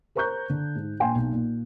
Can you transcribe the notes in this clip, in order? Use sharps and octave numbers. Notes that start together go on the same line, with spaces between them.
A#4 C5 A#5 C#6 F#6 G6
D3
G#2
A#1 G5 G#5 C6
B1
A#2